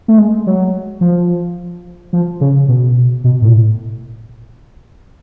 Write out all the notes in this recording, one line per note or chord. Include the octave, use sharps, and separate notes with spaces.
A3
G#3
F#3
F3
F3
C#3
B2
B2
A2